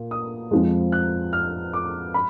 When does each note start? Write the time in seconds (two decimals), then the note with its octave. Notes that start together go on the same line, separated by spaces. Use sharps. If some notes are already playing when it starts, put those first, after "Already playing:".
Already playing: A#2
0.11 D#6
0.51 F2 F3 G#3
0.92 F#6
1.33 F6
1.73 D6
2.14 B5